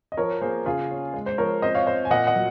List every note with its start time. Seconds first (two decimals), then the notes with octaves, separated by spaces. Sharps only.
0.12 D#5
0.17 F3 A#4 C#5
0.42 A#3 G#4 C5
0.66 C#3 F4 G#4
0.90 C#4
1.14 G#3
1.26 C5
1.38 F3 A#4 C#5
1.62 C4 C5 D#5
1.75 C#5 F5
1.86 C4 C5 D#5
2.05 G#5
2.11 A#2 D#5 F#5
2.27 D#5 F#5
2.35 F#3